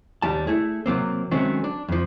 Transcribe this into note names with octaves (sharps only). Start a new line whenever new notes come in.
D#2 G3 A5
A3 E4 G#4
C3 F#3 A#3 C4
D#3 F#3 G#3 A3 C4 C#4
D4
F2 F3